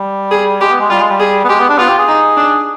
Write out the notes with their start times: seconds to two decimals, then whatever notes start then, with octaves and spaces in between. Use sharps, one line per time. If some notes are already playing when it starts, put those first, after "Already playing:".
Already playing: G3
0.31 G#4
0.61 G#3 G4
0.71 B3
0.80 G#3
0.90 G3 F4
1.00 G#3
1.10 G3
1.20 G#4
1.44 B3
1.49 G#3 G4
1.59 B3
1.69 D4
1.78 B3 F4
1.88 G4
1.99 G#4
2.08 D#4
2.37 D4